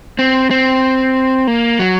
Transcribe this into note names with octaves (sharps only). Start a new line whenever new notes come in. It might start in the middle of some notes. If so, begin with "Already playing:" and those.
C4
C4
A#3
F#3